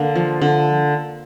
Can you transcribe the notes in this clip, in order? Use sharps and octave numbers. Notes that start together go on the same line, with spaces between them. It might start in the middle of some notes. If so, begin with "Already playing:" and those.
Already playing: D3 A#3
F3
D3